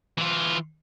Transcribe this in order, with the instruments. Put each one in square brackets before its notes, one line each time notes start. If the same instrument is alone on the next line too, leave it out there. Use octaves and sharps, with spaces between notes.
[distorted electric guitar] E3 F4